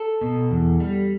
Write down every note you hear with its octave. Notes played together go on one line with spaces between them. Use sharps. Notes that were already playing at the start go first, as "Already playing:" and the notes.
Already playing: A4
B2
E2
G3